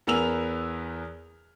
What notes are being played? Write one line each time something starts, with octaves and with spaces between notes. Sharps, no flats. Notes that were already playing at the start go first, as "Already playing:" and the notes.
E2 B3 A#4 G#5 E6 F7